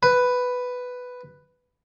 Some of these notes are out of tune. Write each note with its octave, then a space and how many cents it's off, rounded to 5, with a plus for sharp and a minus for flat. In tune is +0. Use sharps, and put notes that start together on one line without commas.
B4 +5